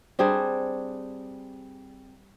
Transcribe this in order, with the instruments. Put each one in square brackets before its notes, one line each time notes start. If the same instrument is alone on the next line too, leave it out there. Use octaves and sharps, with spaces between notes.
[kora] G3 C4 D4 G#4